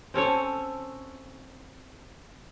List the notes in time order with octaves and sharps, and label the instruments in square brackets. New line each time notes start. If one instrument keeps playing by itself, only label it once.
[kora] C4 C#4 A4 C#5